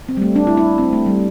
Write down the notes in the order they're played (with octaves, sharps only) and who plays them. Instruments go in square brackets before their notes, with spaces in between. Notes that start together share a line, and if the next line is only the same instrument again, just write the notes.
[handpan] C4
G3
A3
D4
E4
E4
C4
A3
G3